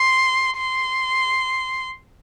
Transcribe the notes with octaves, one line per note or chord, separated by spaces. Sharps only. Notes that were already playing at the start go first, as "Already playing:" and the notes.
Already playing: C6
C6